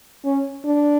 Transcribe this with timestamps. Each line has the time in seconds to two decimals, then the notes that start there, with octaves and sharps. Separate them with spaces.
0.25 C#4
0.65 D4